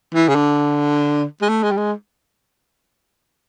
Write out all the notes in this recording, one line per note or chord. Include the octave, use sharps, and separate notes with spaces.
E3
C#3
D3
G#3
A3
G#3
G3
G#3